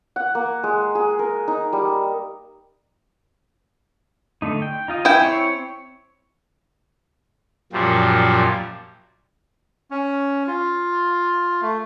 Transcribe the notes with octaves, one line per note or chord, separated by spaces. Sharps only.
F#5
A#3
G#3
G#4
A#4
D#4
G3
D3 A3 D#4
G5
D#4 F4 D#5
E4 G5 G#5
C4 C#5
F#2 A#2 F3 G3
C#4
F4
A3